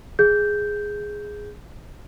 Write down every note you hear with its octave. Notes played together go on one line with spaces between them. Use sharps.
G#4 G6